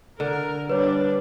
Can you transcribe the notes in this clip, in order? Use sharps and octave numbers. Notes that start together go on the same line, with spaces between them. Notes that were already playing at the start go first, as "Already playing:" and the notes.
D3 A#4
G3 D4 B4 C#5